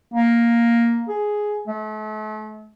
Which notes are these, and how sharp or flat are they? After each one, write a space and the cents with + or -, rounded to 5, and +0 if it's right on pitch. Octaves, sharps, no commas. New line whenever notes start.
A#3 +5
G#4 +5
A3 -40